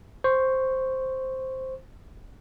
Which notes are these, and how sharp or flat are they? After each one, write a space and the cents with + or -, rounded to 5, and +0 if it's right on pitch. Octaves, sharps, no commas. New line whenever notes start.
C5 +0 C#6 +0